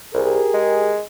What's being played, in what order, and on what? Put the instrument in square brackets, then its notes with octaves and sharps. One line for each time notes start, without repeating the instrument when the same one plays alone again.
[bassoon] C2 [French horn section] G4 G#4 A#4
[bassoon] G#3